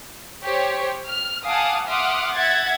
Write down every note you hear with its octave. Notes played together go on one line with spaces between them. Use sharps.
G4 C5 C#5
F6
F5 F#5 G#5 A5 D6 D#6
E5 F#5 C6 D6 D#6 F6
E5 F#5 G#6 A6